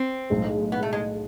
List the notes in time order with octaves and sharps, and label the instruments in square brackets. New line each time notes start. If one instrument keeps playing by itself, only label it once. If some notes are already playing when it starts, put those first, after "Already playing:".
Already playing: [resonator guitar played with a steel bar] C4
[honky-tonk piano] B1 A2 G#3
[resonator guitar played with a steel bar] B3
A3
G#3